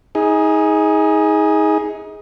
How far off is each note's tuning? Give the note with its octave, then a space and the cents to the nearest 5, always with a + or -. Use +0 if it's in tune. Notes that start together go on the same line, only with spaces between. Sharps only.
D#4 +30 G#4 +0